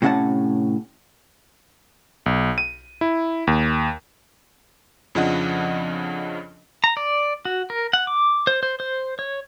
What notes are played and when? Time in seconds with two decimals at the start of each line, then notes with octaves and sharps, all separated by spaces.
0.02 A2 C3 C#4 F5 F#5 A5
2.26 B1
2.58 D#7
3.01 E4
3.47 D#2
5.15 F2 C#3 F3 D4 D#5 F#5
6.84 A#5
6.97 D5
7.45 F#4
7.70 A#4
7.93 F#5
8.07 D6
8.47 C5
8.63 C5
8.80 C5
9.19 C#5